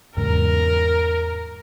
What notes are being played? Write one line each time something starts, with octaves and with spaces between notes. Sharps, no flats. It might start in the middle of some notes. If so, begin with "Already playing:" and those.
E2 G#2 C#3 A#4